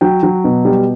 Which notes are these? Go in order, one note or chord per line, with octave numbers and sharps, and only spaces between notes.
F#3 G5
F#3
B2
G3